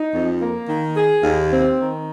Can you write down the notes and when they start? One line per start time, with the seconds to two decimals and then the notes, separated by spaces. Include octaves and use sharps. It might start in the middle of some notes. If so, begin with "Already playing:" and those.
Already playing: D#4
0.14 F2
0.42 A#3
0.69 D#3
0.96 G#4
1.24 D#2
1.51 C4
1.78 D#3